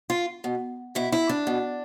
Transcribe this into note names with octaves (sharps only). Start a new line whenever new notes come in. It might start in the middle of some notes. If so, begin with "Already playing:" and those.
F4
B2
B2 E4
E4
D4
B2